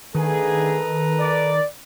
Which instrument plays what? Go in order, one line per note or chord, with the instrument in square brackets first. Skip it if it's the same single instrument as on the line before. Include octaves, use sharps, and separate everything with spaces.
[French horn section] D3 A3 G#4 [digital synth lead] D#3 [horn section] A4 B4 A#5
[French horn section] D5